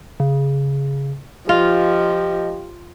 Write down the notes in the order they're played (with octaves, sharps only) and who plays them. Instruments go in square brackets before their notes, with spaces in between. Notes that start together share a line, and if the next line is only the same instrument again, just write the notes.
[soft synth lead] C#3
[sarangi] F3 [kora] F4 [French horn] G4 [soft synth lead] D#5